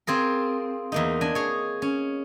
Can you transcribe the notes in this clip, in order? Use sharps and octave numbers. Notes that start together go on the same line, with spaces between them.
C4 F4 G#4 A#4
E2 A#3 D#4
D4 D#5 G#5
G#4 C#5
C#4